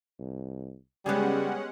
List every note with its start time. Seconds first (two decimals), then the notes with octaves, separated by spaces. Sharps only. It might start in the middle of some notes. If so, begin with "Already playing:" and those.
0.19 C2
1.06 C#3 G3 G#3 B3 C#4 G4 G#4 F#5